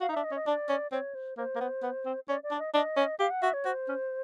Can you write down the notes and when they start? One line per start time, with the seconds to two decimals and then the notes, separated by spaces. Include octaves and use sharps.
0.01 F#4 F5
0.09 D#4
0.12 D4 E5
0.24 D#5
0.31 C#4
0.36 D#5
0.46 D4 D5
0.69 C#4
0.92 C4 C#5
1.15 C5
1.37 A#3 C5
1.56 A#3
1.60 B3
1.83 B3
2.06 C4
2.28 C#4 D5
2.43 D5
2.51 D4
2.59 D#5
2.74 D4 D#5
2.97 C#4
3.20 G4 F5
3.30 F#5
3.42 F#4 E5
3.53 C#5
3.65 F#4 C5
3.88 C#4